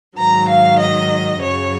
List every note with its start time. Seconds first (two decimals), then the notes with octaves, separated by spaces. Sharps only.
0.18 G#2 D#3 F#3 A#5
0.49 F5
0.80 D#5
1.42 F#2 C#3 F#3 C#5